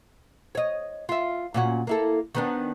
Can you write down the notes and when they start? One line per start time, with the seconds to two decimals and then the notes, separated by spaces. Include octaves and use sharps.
0.55 C#5 D#5
1.09 F4 E5
1.54 A#2 C#4 F#4
1.87 A#3 E4 A4
2.35 D#3 B3 D4